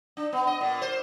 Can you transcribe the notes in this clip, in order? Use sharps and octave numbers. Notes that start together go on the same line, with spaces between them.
D4
B3
D#5
A#2
C5